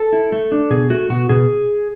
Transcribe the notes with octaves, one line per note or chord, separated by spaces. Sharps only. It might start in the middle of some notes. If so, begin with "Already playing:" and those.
Already playing: A4
E4
A3
D4
B2 G#4
A3 F#4
B2 F#4
B2 G#4